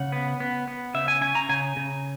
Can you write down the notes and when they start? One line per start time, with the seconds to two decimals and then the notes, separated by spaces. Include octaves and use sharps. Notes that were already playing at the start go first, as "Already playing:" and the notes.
Already playing: C#3 F#5
0.12 B3
0.40 B3
0.68 B3
0.94 C#3 E5
1.08 G#5
1.21 C#4 G#5
1.35 A#5
1.49 C#3 G#5
1.76 C#3